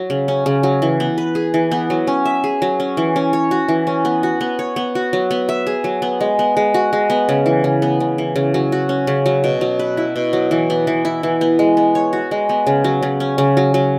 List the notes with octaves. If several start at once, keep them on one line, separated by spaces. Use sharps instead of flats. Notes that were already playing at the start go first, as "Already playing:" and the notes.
Already playing: F#3
C#3
C#4
C#3
F#3
E3
B3
B4
G#4
E3
B3
F#3
C#4
E5
G#4
F#3
C#4
E3
C#4
C#5
F#4
E3
C#4
B3
F#4
B3
C#5
B3
F#4
F#3
B3
E5
G#4
F#3
B3
G#3
B3
G#3
F#4
G#3
B3
C#3
E3
C#3
B3
C#3
E3
C#3
F#3
F#4
C#4
C#3
F#3
B2
F#3
B4
E4
B2
F#3
E3
B3
E3
E4
E3
B3
G#3
B3
C#5
F#4
G#3
B3
C#3
F#3
C#3
C#4
C#3
F#3
F#3